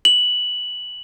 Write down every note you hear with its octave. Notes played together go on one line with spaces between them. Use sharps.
F#7